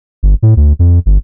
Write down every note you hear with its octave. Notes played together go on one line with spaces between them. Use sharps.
G1
A2
D2
F2
G1